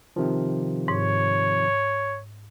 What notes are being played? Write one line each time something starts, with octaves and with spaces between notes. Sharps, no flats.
C3 D#3 F3
G#2 C#5